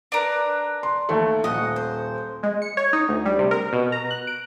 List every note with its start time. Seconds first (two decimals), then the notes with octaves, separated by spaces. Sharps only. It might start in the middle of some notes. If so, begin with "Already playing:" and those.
0.12 D4 A#4 B4
0.83 C6
1.09 D#2 A3
1.44 D#1 D#5 F#5
1.76 C5
2.43 G#3
2.62 C#7
2.77 C#5
2.93 D#4
3.09 D2
3.26 G3
3.39 C3
3.51 A#4
3.73 B2
3.92 A#5
4.11 F#6
4.27 D7